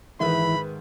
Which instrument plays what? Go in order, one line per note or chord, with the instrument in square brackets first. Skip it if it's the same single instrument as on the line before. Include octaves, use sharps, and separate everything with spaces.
[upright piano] G#2 D#3 [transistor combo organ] E3 [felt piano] B4 E5 [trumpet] B5